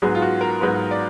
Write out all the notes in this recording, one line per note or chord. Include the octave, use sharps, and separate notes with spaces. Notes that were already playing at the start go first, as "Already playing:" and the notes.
G#2 F#3 B3 G#4
F4
F#4
A#4
G#2 F#3 B3 B4
D5